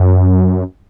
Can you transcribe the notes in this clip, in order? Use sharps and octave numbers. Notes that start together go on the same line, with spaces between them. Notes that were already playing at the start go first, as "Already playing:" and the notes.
Already playing: F#2